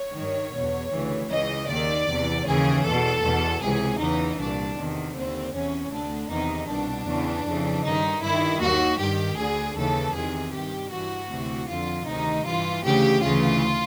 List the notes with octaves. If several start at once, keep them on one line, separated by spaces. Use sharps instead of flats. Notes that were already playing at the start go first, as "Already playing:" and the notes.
Already playing: C#5
G2 D#3
E2 B2
D2 C#3 E3
C#2 C#3 E3 D#5
D#2 D#3 D5
E2 C3 E3
D#2 C#3 E3 G#4
E2 B2 A4
E2 B2
C#2 C3 E3 G#4
E2 C#3 E3 D#4
C2 A#2 D4
E2 C3 D#3
D#2 D3 C4
E2 C3 E3 C#4
D2 D3 D4
E2 C3 D#3 D#4
C2 B2 D4
E2 C#3 E3
F2 C#3 E3
G2 D#3 D#4
G2 D#3 E4
D#2 D#3 F#4
G2 D#3 G4
D2 D3 G#4
D#2 C#3 E3 A4
E2 C3 D#3 G#4
G2 D#3 G4
G2 E3 F#4
D2 C3 E3
F2 D3 F4
D2 C3 D#3 D#4
G2 E3 F4
D2 C#3 E3 G4
D2 C#3 E3 F4